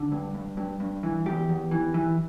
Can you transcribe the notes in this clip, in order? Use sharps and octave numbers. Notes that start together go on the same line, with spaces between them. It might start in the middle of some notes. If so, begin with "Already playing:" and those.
Already playing: D3
G2
G2
G2
G2
E3
E2 G4
E2
E3
E3